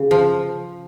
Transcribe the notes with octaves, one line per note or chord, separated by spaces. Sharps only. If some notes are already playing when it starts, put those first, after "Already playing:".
Already playing: C#3 G4
F3